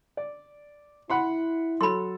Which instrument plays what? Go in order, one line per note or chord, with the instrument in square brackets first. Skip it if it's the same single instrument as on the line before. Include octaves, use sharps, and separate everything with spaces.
[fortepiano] D5
[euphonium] E4 [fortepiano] F#5 B5 C6
[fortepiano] F#3 A4 [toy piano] B5 C6